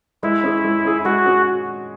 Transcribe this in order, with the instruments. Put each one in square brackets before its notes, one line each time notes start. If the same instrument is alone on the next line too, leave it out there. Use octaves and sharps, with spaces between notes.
[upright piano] G#3 [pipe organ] E4
[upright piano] C#4 G#4
G#3
C#4 G#4
[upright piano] G#3 [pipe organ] F#4
[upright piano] C#4 G#4